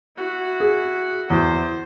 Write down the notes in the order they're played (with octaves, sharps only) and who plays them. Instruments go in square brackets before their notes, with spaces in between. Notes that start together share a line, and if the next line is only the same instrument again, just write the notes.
[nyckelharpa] E4 F#4
[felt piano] G#4
[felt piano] E2 [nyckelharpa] C5